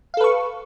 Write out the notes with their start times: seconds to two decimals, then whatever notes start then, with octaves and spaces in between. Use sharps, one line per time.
0.14 F5
0.17 A4
0.21 B4
0.24 C#6